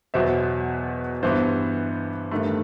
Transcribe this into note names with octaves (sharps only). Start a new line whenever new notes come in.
E2 B2 F#3 B3 C5 E5
G2 E3 B3 C5 E5
G2 D#3 A3